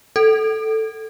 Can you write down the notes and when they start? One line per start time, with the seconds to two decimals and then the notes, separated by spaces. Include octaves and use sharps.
0.16 A4